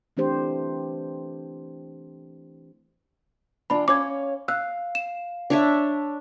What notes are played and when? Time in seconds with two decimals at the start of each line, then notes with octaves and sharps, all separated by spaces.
0.17 E3 A3 C4 D4 G4 C5
3.70 E3 D4 F4 B5
3.88 C#4 C#5 F5 D6 G#6
4.48 F5 E6 F#6
4.95 E7
5.50 D4 C#5 E5